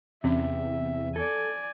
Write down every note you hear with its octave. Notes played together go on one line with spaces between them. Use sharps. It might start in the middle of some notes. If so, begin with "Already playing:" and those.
E2 C3 E3 C4 C#4 E5
A4 D5 G#5